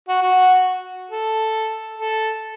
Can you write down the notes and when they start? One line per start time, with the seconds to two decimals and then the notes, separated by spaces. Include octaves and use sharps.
0.08 F#4
0.22 F#4
1.11 A4
1.99 A4